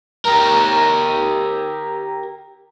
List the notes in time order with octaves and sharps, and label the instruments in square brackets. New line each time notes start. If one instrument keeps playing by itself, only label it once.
[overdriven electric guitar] G4 A#4